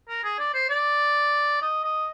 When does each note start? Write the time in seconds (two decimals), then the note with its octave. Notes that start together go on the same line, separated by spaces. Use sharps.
0.09 A#4
0.24 G#4
0.39 D5
0.54 C5
0.70 D5
1.62 D#5
1.84 D#5